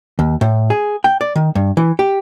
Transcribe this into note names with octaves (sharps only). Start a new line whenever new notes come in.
D#2
A2
G#4
G5
D5
D#3
G2
E3
G4